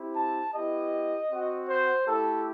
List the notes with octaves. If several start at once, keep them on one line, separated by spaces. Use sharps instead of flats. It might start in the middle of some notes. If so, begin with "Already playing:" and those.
Already playing: C4 E4 G4
A5
B3 E4 G4 D#5
C4 F#4
C5
A3 E4 G4 A4